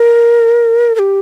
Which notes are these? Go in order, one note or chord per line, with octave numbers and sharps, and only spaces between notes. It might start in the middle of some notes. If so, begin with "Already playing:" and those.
Already playing: A#4
A#4
G4